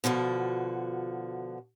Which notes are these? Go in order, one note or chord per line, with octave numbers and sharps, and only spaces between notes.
B2 D3 F3 F#4